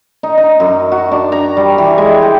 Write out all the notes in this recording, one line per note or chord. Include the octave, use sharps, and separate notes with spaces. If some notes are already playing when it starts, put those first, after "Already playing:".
D#4
D#4
F#2
F#4
D4
A#5
G3
E3
G#3
G5